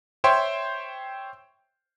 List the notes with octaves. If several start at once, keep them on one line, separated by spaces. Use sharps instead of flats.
C5 C#5 E5 G5 C6